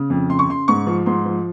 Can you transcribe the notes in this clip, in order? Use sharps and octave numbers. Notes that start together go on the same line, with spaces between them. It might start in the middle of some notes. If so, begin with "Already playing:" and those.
Already playing: C#3
F2
C#3 C6
C#6
C#3 C6
G#2 C#6
F3
G#2 C6
F3